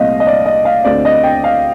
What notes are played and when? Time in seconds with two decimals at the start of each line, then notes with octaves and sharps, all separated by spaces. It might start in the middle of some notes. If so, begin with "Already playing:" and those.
Already playing: C2 A#2 A3 C4 D#5 F5
0.20 D#5
0.27 D5
0.46 D#5
0.65 F5
0.84 D2 D3 A3 C4 D5
1.05 D#5
1.24 G5
1.44 F5